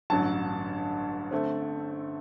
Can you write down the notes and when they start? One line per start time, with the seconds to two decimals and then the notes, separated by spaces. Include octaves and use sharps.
0.10 A1 G2 D3 F#3 A5
1.31 D3 A3 C4